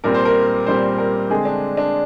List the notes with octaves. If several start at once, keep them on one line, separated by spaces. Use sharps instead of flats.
A#2 G3 C4 A#4
C5
A#4
A#2 G3 C4 C5
A#4
D3 G#3 C4 G#4
D4
D4